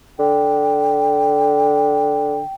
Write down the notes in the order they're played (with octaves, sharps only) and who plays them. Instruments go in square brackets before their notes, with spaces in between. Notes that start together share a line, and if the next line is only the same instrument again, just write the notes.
[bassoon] D3 [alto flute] G5